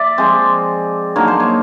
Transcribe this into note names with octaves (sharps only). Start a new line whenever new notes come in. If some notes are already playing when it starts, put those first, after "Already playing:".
Already playing: D5 E5
F3 G#3 C4
D3 F#3 A#3 D#4 C#5
C5
C#5